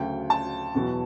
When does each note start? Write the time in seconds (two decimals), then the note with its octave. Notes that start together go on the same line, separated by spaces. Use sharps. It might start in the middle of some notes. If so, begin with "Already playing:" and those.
Already playing: D2 C#3 F#3 G5
0.30 A5
0.75 E2 B2 F#3